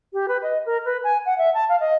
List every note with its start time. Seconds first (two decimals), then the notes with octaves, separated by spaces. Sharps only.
0.13 G4
0.28 B4
0.42 D#5
0.65 A#4
0.85 B4
1.03 G#5
1.25 F#5
1.38 E5
1.54 A5
1.69 F5
1.80 D#5